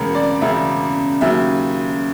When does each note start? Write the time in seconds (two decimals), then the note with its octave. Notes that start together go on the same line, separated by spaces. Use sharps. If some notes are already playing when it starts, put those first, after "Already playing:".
Already playing: E1 D2 C#3 A#4
0.15 D5
0.41 E1 D2 C#3 E5
1.21 D#2 C#3 F#3 E5